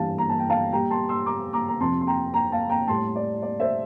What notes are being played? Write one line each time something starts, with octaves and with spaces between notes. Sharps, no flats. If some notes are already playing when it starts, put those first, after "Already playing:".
Already playing: G2 E3 G3 F5 A5
A#5
A5
G5
F5 A5
A#2 G3 G5 A#5
A5 C6
C6 E6
A#5 D6
A#5 D6
A#5
F2 C3 F3 A5 C6
C6
G5 A#5
G5 A#5
F5 A5
G5 A#5
A2 G3 A5 C6
D5
D5
C5 E5